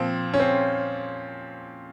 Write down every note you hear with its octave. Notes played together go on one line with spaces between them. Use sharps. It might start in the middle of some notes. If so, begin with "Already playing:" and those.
Already playing: A#2 F3 C4
C#4
C4